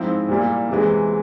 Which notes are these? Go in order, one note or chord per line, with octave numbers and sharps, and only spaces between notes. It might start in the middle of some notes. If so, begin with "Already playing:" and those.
Already playing: G#2 F3 C4 E4
A#2 G3 A#3 E4
E2 C3 E3 G#3